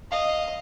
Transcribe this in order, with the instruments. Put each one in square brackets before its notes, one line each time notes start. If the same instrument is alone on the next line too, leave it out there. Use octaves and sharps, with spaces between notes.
[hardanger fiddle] D#5 [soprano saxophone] F5